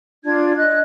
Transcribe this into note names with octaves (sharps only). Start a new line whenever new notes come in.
D4 F4 G#6
D#5 F#6